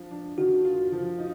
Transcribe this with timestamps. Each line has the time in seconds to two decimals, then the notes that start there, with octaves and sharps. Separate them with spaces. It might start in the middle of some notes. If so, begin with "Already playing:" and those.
Already playing: F3 D4
0.11 D4
0.38 D#3 F#4
0.65 F4
0.92 F3
1.18 D#4